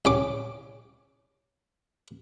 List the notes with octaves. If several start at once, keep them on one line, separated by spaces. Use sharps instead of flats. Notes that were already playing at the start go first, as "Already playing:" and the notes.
C2 C#4 D6